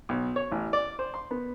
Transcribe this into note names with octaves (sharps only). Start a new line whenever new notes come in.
B1
C#5
A1
D5
C5
C6
B3